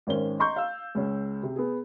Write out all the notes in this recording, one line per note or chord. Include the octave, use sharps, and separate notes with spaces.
G#1 D#3 C#4 C5 G7
D#5 A#5 C6 C#6 G6
F5 E6
C#2 C#4
C3
B3 G#4